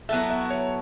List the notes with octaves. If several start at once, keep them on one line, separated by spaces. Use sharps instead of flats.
F#3 B3 E4 A4 E5
E5
C#5